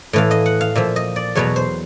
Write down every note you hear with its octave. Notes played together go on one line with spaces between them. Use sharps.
A2 E3 F5
D#5
F#5
F5
A#2 F3 E5
D#5
D5
E2 B2 F#3 C#5
C5